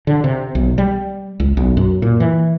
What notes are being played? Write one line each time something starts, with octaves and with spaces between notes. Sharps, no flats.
D3
C3
B1
G3
C#2
B1
F#2
A#2
E3